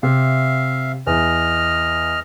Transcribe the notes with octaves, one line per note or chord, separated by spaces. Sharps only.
C3 E5 F5
E2 D#5 F6